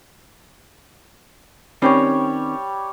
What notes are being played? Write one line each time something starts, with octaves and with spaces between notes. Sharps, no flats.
D#3 G3 C4 C#4 G4 C#5